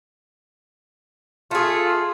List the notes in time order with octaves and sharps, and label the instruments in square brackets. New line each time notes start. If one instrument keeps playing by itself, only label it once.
[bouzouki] A3 G#4 [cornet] F4